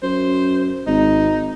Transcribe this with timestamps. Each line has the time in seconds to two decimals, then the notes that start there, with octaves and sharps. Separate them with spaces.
0.03 F#2 C5
0.87 G#1 D#4